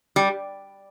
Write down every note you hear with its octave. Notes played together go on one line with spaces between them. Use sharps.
G3